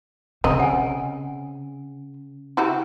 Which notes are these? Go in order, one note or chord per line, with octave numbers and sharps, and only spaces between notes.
C#3 C4 D#5
F#5 G#5
E4 F#4 G4